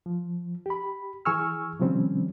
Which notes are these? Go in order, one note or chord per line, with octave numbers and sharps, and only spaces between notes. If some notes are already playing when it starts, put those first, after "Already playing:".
F3
G4 B5
E3 G#4 G#5 C#6 E6 F6
C3 D#3 F3 G3 C4 C#4